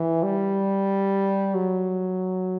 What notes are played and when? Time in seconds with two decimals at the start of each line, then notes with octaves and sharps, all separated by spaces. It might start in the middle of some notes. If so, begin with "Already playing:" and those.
Already playing: E3
0.23 G3
1.55 F#3